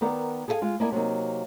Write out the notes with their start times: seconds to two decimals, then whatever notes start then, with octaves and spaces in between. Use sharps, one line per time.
0.01 D#3 B3 A#4 D5 F#5
0.48 G#4 A4 B4 E5 F5 G#5
0.62 G#3 F4
0.80 A#3 B3 E4 D5 G#5 A5
0.92 C3 F#3 A#3 D#4